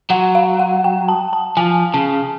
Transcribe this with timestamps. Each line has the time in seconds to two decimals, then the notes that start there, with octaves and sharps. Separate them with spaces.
0.10 F#3 F#5
0.35 F5
0.59 F#5
0.84 G5
1.08 A5
1.33 A5
1.57 F3 G#5
1.94 C#3 A5